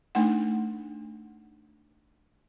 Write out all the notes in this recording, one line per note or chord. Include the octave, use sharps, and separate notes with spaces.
A3 D4 D#4 F#5